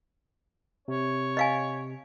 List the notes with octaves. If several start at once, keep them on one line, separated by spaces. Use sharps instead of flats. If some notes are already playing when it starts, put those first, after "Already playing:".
C3 C#5
D#5 F5 G#5